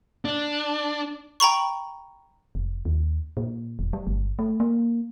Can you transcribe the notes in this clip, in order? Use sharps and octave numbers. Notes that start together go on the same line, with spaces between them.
D4
G5 A#5 B5 C#6
F1
D#2
A#2
E1
G3
G1
A3
A#3